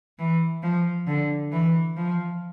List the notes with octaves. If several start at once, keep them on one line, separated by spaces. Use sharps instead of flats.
E3
F3
D3
E3
F3